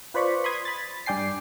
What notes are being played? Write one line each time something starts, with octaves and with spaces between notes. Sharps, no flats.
F4 B4 C5 D5 B5 C#6
B5 C6 D#6 G#6
B5 A6
G2 D5 G5 G#5 C7